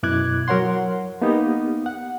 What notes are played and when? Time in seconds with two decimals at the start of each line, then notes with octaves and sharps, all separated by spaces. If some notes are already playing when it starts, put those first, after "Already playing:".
0.03 F#2 B2 E4 D6 F#6 G#6
0.48 F#3 A#4 C#5 F#5 C6
1.22 A#3 B3 D#4 G4
1.86 F#5